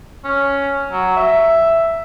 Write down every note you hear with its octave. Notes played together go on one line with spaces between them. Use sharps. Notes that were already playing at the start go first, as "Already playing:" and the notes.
C#4
F#3
E5